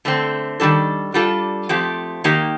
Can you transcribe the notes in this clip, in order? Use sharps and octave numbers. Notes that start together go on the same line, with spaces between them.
D3 A3 C4
D#3 G3 D4 A4
G3 D4 F4 A4
F3 A3 C4 G4
D#3 A#3 D#4 G4